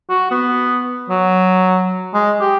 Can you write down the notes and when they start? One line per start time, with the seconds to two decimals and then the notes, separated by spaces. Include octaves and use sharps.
0.10 F#4
0.32 B3
1.10 F#3
2.14 G#3
2.41 G4